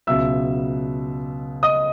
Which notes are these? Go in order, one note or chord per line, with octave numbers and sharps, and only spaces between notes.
C#2 B2 F#3 E5 E6
D#5 D#6